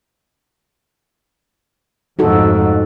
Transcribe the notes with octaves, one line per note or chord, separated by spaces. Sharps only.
F2 G#2 D#4 F#4 A4